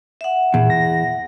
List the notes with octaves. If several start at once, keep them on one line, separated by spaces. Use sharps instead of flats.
E5 F#5
E2 A#2
A#6